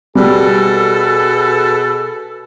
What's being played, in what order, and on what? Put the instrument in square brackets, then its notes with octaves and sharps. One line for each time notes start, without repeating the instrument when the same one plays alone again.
[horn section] B2 G#4 A4 [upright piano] G3